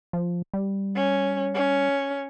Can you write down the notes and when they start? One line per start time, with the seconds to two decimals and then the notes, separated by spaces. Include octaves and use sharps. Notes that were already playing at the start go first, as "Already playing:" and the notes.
0.13 F3
0.54 G3
0.96 C#4
1.54 C#4